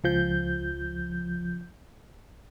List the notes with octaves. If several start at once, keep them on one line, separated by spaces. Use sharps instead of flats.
C#2 F3 G6